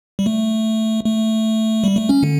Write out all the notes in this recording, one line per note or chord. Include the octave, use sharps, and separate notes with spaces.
G3
A3
A3
G3
A3
C#4
D3